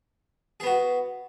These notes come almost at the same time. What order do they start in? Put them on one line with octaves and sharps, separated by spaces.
G#4 B3 F#4